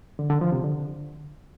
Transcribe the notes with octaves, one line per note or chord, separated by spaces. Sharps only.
D3
D3
F3
C3
D3